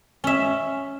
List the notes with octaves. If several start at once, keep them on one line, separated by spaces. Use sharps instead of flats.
C#4 E5